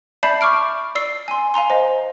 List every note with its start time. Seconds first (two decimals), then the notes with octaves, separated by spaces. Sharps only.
0.23 D5 E5 A5 B5 G6 C7
0.41 C#6 D6 F6 D7
0.95 D5 E6 C7
1.28 G#5 C6
1.54 F5 G#5 A#5 C6
1.70 C5 D#5